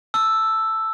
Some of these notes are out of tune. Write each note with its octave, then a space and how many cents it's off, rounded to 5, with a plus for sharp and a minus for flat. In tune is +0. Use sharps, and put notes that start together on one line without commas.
A5 +5 E6 +0